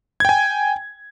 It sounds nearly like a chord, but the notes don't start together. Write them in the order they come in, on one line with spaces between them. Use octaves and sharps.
G#6 G5 G#5